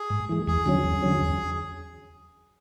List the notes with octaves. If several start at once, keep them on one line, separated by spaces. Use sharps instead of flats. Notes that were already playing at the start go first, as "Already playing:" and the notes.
Already playing: G#4
G#2
E3 G#3
E2 G#4
D3 F#3 C#4
E2
D3 F#3 C#4
E2